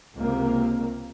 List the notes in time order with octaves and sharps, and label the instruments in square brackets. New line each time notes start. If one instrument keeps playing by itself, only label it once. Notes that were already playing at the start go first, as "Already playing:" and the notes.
[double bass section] C#2 C3 A#3